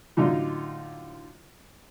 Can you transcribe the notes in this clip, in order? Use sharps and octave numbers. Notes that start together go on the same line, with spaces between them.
A2 D3 F#3 D#4 F4